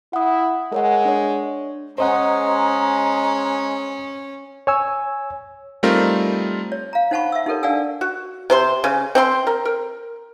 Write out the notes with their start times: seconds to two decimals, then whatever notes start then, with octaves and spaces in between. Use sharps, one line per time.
0.13 E4 F#5 D#6
0.72 G#3 A#4 C#5 F#5
1.05 D4 C#5
1.98 G#3 C#4 C5 D#5 F#5 A#5
4.67 C#5 G#5 E6
5.83 G3 A3 C4 D#4 F4 A#4
6.72 C#5
6.93 F5 A#5
7.11 D#4 C5 F#5 A5 B5 C#6
7.32 E5 E6
7.46 D#4 G4 A4 A#4 C#5
7.63 D4 D5 F5 F#5 G#5 E6
8.01 F#4
8.50 C3 C5 C6
8.84 C#3
9.15 C4 G5 C6
9.47 A#4
9.65 A#4